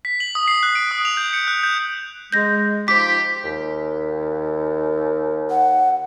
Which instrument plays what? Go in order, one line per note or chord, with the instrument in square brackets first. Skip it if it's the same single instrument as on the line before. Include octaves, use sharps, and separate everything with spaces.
[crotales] B6
F#7
D#6
C7
F#6
D7
D#6
F7
G6
C#7
F#6
G6
[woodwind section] G#3 [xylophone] G6 A#6
[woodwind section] F3 D#4 F4 [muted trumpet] G4 [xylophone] D6 [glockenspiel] B6
[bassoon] D#2
[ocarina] F#5